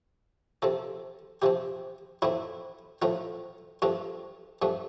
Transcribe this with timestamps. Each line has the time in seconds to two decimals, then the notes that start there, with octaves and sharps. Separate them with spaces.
0.62 C3 F3 C4 A4
1.42 C3 F3 C4 G4
2.22 A2 F3 A3 C4 E4
3.02 A2 F3 A3 C4 F4
3.82 G2 F3 A3 C4 F4
4.62 G2 F3 A3 C4